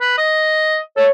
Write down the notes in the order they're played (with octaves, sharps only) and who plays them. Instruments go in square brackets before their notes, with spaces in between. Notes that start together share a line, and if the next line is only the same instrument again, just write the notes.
[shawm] B4
D#5
[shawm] A4 [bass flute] C#5